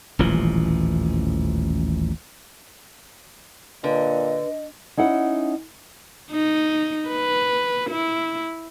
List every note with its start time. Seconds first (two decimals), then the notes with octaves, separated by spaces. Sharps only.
0.19 D#1 A1 E3 F3
3.84 A#2 D3 B4 D#5
4.97 C#4 D#4 E4 F#5
6.32 D#4
7.09 B4
7.90 E4